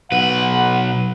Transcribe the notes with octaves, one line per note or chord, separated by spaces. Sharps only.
B1 B4 F#5